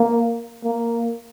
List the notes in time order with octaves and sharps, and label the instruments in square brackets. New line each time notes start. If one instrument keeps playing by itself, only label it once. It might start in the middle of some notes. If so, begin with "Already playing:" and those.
Already playing: [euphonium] A#3
A#3